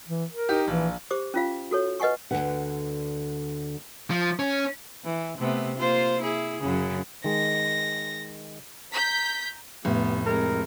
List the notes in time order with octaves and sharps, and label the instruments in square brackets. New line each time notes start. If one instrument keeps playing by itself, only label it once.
[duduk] E3
A#4
[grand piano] D#4 G4
[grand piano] A#1 [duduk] E3
[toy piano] G4 C5 D6
C#4 F4 F5
F#4 A4 C#5
B4 D#5 F#5 G#5 C#6
[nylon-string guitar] D2 G#2 D3 B4 F#5
[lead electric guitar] F3
C#4
[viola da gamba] E3
C3 A3 B3
A#3 F4 C5
E4 G#4
F#2 C#3
[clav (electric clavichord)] D#3 G#3 [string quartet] A#6
[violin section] A#5 G6 B6
[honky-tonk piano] F1 [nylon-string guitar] A2 [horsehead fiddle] B3
[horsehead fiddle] G#3 C4 [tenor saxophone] A#4